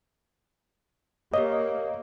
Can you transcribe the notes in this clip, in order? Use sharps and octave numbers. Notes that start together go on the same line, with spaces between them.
A#3 G4 A#4 C#5 D#5